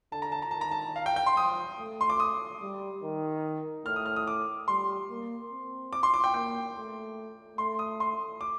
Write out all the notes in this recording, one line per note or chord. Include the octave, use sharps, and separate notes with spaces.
D3 A5
A#5
A5
A#5
D#3 A5
A#5
A5
F5
G5
G5
C6
F3 D#6
A3
C6
D6
D#6
G3
D#3
A2 F6
D#6
F6
D#6
D6
G3 C6
A#3
C4
D6
C6
D6
G5
A#3 G5
A3
A3 C6
D#6
C6
D6